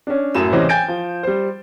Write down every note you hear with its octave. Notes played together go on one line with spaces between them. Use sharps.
C#4 D4
F#2 A2 F#3 E7
C#2 C3 E3 C#4 C5 D#5
G5 G#5 G6 A6 D7
F3
G3 C5